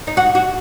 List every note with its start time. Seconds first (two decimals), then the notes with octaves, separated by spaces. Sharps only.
0.07 D#4
0.17 F#4
0.35 F#4